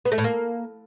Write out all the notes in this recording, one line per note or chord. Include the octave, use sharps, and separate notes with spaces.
B3
A3
A2
A#3